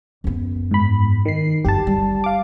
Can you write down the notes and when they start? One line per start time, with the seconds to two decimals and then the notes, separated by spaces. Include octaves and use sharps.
0.24 F#2 B3
0.71 G#2 B5
1.25 D#3 C7
1.65 G1 F#2 G4 A5
1.87 G3
2.24 F5 D6